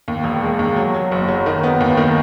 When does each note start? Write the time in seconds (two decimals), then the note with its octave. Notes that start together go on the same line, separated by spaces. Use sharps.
0.08 D#2
0.24 E1
0.42 G#3
0.59 D#2
0.76 F#3
0.94 F#3
1.12 F#1
1.28 F#3
1.46 D#3
1.63 B3
1.80 D#2
1.97 D#3